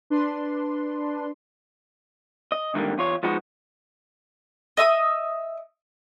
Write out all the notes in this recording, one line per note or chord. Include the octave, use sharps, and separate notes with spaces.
D4 B4 C6
D#5
C2 G#2 D3 D#3 G3 A#3
E2 F4 C#5
F3 G#3 B3 D#4 F#4
D#5 E5 D#6